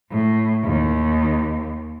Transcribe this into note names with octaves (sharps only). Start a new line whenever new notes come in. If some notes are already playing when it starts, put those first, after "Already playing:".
A2
D#2